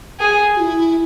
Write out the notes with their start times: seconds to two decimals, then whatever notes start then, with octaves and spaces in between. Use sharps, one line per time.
0.20 G#4
0.56 F#4
0.60 E4